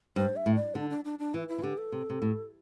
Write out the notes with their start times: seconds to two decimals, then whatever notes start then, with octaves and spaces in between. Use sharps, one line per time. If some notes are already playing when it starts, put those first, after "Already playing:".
0.16 G2 C5
0.36 E5
0.46 A2
0.55 D5
0.75 D3 D4
0.90 D4
1.05 D4
1.19 D4
1.34 E3 E4
1.49 E4
1.58 E3
1.63 D3 G4
1.78 A4
1.92 C3
2.10 C3
2.22 A2